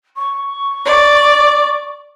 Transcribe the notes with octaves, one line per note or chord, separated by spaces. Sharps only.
C#6
D5